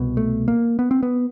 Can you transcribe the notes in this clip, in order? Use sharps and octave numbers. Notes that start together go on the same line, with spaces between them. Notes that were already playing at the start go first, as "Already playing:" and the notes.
Already playing: C2 B2
A3
A#3
B3
C4
B3